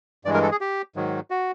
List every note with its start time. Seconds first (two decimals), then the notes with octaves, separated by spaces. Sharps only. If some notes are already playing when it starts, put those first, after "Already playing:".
0.25 G2 E3 G#3 D5
0.34 A#4
0.43 A4
0.51 G#4
0.61 G4
0.96 G#2 D#3 F#3
1.30 F#4